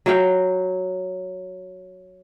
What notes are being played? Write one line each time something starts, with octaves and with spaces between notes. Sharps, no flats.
F#3 F5 G5